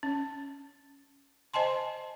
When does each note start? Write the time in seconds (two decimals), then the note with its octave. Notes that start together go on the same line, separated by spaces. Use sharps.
0.03 C#4
1.54 C5 D#5 G#5 A5 C6